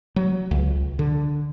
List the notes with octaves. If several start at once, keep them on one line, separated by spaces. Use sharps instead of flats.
F#3
C#2
D3